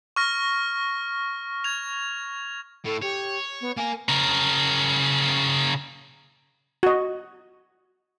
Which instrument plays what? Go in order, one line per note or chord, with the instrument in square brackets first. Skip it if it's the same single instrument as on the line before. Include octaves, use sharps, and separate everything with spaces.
[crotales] C#6 F6 A#6
G#6 F7
[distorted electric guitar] A2 [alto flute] A4
[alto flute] G4 [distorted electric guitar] C#5
[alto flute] B3
[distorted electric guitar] A#3 A#4 [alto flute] G#5
[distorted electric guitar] C#3 A#4
[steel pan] F#4 D#5